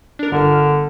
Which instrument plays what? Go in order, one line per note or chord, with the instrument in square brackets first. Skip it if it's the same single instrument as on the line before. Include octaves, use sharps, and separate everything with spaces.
[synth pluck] D4 A#4
[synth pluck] G1 F6 [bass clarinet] D3